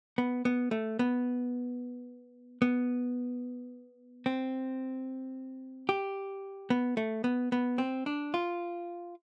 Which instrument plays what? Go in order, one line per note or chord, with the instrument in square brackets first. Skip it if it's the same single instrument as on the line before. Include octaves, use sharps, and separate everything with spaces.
[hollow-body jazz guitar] B3
B3
A3
B3
B3
C4
G4
B3
A3
B3
B3
C4
D4
F4